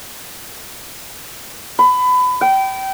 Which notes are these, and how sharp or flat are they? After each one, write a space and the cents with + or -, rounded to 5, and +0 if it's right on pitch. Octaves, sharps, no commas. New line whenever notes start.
B5 +25
G5 -25